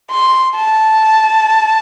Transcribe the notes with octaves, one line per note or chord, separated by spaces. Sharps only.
C6
A5